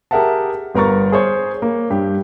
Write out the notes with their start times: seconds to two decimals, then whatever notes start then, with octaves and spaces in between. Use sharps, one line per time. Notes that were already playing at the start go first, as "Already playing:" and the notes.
0.11 G4 G#4 A#4 E5 F#5 A5
0.75 G1 B3 A#4 A#5 C#6 A6
1.12 G#4 C5 C#5
1.62 A#3
1.90 G2 G4